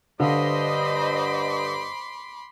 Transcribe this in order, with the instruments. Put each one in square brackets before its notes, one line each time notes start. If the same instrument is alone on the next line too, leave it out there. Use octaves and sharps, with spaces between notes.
[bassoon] G2 [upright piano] D3 F5 [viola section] C5 D#5 [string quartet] B5 C6 D6